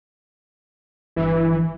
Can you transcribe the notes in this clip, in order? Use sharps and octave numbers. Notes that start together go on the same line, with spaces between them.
G1 E3